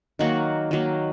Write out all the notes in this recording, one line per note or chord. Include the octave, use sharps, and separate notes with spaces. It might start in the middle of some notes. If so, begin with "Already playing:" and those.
D#3 F#3 A#3 F#4
D#3 F#3 A#3